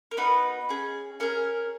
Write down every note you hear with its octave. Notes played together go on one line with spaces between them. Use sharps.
A#4
B3 D#4 F#4 B4
C#4 G#4
C#4 G#4 A#4